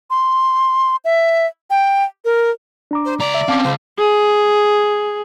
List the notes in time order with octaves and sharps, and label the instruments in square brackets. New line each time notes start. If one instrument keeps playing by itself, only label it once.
[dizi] C6
E5
G5
A#4
[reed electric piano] D4 A#5 D6
[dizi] C5
[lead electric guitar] C#2 A#5 [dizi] D5
[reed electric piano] E5
[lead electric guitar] C4 C#4 [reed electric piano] F5 A5 D6
[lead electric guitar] C#2 [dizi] C5
[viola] G#4